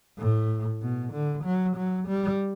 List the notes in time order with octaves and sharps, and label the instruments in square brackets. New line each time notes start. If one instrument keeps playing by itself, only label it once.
[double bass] A2
B2
D3
F#3
F#3
G3